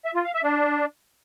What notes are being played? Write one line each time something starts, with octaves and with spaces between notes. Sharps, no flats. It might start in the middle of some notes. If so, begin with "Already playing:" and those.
E5
F4
F5
E5
D4